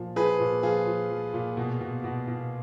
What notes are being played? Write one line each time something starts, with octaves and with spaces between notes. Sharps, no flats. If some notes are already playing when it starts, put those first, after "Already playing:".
Already playing: A#2 F3
F3 G#4 B4
A#2
F3 F4 G#4
F3
F3
A#2
B2
B2
B2
B2